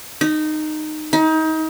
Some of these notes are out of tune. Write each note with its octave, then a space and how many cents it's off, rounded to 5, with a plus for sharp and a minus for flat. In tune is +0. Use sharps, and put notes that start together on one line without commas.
D#4 -15
D#4 +30